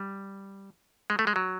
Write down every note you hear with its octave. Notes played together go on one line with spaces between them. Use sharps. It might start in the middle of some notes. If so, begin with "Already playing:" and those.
Already playing: G3
G#3
A3
G#3
F#3